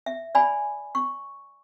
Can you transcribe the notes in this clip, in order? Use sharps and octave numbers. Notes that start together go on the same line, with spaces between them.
E5
D5 G#5 B5
C#6